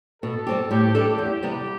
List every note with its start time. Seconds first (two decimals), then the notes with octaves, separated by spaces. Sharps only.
0.23 B2 A4
0.47 G3 C4 G4
0.71 A2 G4
0.95 E3 G3 D4 A4
1.18 E2 G4
1.43 C3 G3 B3